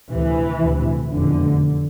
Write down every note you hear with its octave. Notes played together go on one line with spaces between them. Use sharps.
D2 C3 E3
D2 C3
F1 E2 B2 D3